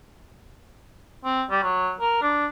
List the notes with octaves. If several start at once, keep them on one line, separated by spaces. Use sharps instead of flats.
C4
G3
F#3
A#4
D4